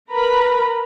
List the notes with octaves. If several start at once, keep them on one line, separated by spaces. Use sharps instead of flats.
A#4 B4 A#5 B5